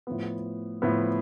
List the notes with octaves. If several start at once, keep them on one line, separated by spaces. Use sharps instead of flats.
A2 F3 B3
A2 F3 B3